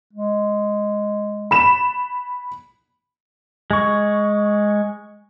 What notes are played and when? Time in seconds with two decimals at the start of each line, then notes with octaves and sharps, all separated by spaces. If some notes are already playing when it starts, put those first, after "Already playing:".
0.13 G#3
1.51 B5 E7
3.71 G#3 C#6